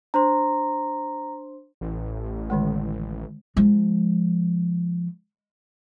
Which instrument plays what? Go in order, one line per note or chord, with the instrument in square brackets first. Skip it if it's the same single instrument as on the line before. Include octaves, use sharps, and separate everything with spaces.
[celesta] D4 C5 C6 [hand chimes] A#5
[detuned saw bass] A1
[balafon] D3 D#3 G#3
[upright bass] F3 G#3